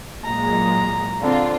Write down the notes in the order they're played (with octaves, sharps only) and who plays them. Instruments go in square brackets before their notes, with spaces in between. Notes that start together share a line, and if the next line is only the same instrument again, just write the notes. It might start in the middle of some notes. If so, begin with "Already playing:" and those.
[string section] A#2 F#3 G#3 [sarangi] A#5
[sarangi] D3 [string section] C4 F4